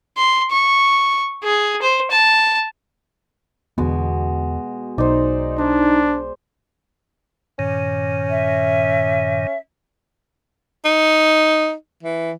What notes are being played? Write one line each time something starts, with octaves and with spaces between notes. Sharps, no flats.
C6
C#6
G#4
C5
A5
E2 B2 D3 G#3 B3 F#4
B1 D#4 C5 D5
D4 C5
G2 A#2 D#3 C#4
E5
D#4
E3